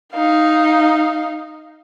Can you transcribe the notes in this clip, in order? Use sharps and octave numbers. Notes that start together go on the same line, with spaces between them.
D#4 F5